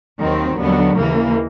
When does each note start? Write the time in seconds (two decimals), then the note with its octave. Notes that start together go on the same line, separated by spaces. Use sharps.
0.20 D#2 D#3 F#3 C4
0.59 D#2 D3 F#3 B3
0.97 D#2 C#3 E3 A#3